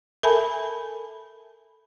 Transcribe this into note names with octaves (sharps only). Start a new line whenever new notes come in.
A4 A#4 E5 G#5 A5 B5